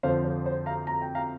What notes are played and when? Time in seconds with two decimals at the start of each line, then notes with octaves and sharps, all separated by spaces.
0.03 F2 D3 F3 C5 F5
0.24 C5
0.46 C5
0.66 F5 A#5
0.87 A#5
1.02 G5
1.15 F5 A#5